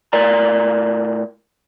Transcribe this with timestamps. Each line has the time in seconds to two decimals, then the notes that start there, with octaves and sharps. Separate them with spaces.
0.13 A2 A#4 D5 A#5